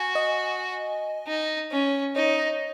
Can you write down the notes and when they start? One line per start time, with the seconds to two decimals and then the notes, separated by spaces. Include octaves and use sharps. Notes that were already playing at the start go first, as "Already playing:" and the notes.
Already playing: F#4 G#5
0.15 D#5
1.27 D#4
1.72 C#4
2.16 D#4 C#5